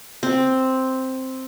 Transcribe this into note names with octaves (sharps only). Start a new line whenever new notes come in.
C4